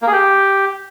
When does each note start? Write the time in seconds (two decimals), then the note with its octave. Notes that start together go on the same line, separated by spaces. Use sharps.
0.02 A#3
0.07 G#4
0.12 G4